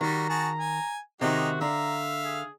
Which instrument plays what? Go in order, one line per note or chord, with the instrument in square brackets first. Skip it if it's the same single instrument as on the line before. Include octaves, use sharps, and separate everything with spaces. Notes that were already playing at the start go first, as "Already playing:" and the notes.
[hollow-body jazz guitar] D#3 [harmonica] G3 F#4 [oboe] A#5
[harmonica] F#4 G#4 A5
G#5
[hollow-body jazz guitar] C3 D#3 [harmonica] G#3 D#4 G4 [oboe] F#4
[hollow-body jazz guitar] D3 [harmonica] E5 F5 [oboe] A#5
[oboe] G#4